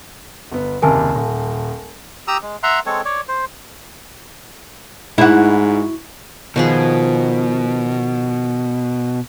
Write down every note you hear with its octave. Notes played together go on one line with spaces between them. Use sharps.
G1 B3
F#1 D#2 C3 A#4 G#5 A5
D#1
G4 A#5 D#6 E6
G#3
E5 F#5 A#5 C6
G#3 C4 A4 C#5
C#5 D5
C5
G#2 E4 F#4
B2 D#3 F3 G#4